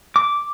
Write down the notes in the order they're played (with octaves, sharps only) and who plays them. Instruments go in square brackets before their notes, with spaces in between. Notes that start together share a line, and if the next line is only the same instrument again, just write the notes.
[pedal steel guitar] D6